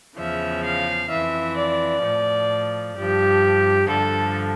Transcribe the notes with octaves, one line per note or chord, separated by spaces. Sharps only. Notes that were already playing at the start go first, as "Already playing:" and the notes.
E2 C#3 F3 E5
F5
F2 E3 E5
D5
A2 F3
G2 F3 G4
G2 D3 F3 A4